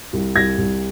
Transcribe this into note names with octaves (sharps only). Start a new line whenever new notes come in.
C2
C2 G#6 A#6
C2